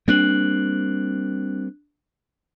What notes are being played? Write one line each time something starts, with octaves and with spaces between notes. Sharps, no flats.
G3 A#3 C4 D4 F#6 F#7